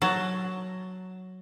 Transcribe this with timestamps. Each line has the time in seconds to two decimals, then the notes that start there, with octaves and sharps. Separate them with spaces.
0.02 F#3 A5